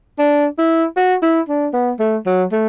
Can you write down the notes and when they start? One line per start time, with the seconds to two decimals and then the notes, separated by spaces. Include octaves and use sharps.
0.19 D4
0.58 E4
0.97 F#4
1.23 E4
1.49 D4
1.73 B3
1.99 A3
2.26 F#3
2.52 A3